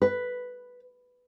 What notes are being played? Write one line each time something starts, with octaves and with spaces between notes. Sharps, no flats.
B4